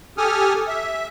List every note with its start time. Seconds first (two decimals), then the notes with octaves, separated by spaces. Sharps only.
0.17 G4 A4 G#5 D#6 F6
0.68 E5